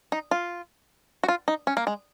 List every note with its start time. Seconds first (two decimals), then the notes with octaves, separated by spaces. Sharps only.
0.12 D#4
0.31 F4
1.23 F#4
1.28 F4
1.48 D#4
1.67 C#4
1.77 A#3
1.87 G#3